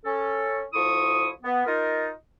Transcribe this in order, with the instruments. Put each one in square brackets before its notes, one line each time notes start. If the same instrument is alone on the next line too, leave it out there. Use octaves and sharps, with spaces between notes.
[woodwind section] C#4 A4
D2 F3 E4 C#6 D#6
B3
D#4 F4 A#4